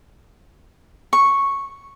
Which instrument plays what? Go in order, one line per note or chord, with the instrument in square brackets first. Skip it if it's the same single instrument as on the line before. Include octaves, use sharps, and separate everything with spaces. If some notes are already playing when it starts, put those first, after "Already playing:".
[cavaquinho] C#6